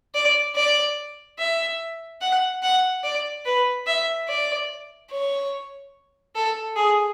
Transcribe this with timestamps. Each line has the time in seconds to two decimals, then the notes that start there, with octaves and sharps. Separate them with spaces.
0.14 D5
0.56 D5
1.39 E5
2.21 F#5
2.63 F#5
3.04 D5
3.45 B4
3.87 E5
4.28 D5
5.11 C#5
6.35 A4
6.76 G#4